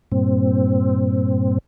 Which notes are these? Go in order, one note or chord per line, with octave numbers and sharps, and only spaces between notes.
G2 A#2 C4